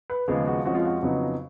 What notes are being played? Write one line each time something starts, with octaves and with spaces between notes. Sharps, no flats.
B4
D#2 C#3 F3 G#3 B3 G#4
F#4
F2 F3 G#3 C#4 F#4
F4
F#4
F2 C#3 F#3 B3 D#4